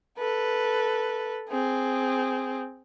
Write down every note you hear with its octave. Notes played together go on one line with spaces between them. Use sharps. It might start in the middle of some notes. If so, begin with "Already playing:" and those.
A4 B4
C4 G#4